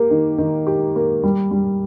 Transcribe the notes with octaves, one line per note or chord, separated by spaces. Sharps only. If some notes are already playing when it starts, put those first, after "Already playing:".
Already playing: A#3 G4
D#3
D#3
G4
A#3
G3
G3